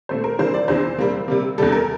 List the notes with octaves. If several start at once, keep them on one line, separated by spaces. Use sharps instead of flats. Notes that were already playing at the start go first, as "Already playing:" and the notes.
A#2 A3 C4 C5
A#4
C3 E3 G3 A#3 C5
D5
E2 C3 E3 C5
C3 G3 A#3
C3 G3 A#3
E2 C3 G3 A4
A#4